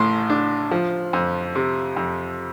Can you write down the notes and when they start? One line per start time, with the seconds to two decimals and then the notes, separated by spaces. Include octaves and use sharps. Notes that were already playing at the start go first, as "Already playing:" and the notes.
Already playing: A1 A2 C6
0.30 D4
0.71 F3
1.13 F2
1.55 C3
1.97 F2